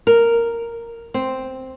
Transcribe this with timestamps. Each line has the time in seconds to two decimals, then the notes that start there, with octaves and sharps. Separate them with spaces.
0.07 A#4
1.14 C4